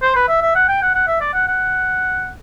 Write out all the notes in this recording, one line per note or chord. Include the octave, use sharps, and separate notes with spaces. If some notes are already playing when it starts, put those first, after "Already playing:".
C5
B4
E5
E5
F#5
G5
F#5
F#5
E5
D5
F#5
F#5